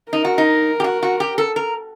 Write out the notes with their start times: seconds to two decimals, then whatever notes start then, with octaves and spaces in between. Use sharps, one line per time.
0.12 D#4 A#4
0.25 F#4
0.38 D#4
0.80 G4
0.84 F#4
1.03 F#4
1.20 G4
1.38 A4
1.56 A#4